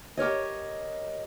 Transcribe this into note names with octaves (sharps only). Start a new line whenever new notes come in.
G4 A#4 C#5 D#5